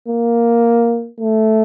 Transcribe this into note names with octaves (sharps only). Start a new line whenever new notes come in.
A#3
A3